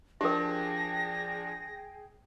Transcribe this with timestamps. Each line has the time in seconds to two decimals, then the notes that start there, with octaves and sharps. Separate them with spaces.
0.21 F3 D4 G4 G#4 A#4 G5 A#6